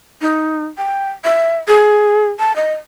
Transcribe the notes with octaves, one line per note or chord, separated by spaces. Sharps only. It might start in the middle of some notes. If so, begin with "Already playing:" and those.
D#4
G5
E5
G#4
A5
D#5